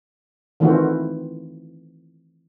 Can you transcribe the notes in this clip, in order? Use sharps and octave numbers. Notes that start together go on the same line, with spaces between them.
D#3 E3 A3 C4 F4 F#4